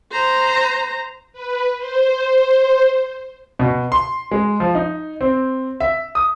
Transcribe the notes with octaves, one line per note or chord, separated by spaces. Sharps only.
C5 A#5
B4
C5
B2
C6
G#3
F3
D#4
C4
E5
D#6